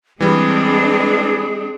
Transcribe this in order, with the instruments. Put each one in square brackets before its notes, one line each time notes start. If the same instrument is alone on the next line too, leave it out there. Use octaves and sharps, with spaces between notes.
[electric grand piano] E3 G3 [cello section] G#3 C4 D4 [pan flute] G#4